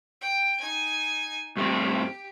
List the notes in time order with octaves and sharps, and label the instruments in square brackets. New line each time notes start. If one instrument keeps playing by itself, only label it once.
[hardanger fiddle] G5
D#4 G#5
[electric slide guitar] G2 A3 C4 [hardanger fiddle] G4